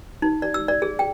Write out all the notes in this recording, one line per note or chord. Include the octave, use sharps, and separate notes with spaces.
D#4
D5
E6
D5
G#4
G5